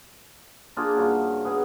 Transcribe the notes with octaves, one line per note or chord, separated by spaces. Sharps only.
A#3 D4 F4 G#4
G2 C#3 F#4
B2 B3 G#4